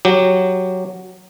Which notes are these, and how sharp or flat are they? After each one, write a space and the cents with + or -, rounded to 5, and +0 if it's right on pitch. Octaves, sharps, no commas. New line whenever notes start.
F#3 +0 G4 +0